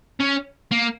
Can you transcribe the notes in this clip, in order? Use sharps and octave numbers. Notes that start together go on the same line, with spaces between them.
C#4
A#3